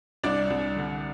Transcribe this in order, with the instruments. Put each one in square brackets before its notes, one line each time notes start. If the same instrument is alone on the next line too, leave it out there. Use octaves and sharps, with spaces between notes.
[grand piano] C2 D4 D5
C2
D3